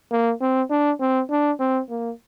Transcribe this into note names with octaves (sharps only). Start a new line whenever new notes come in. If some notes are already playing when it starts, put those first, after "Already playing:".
A#3
C4
D4
C4
D4
C4
A#3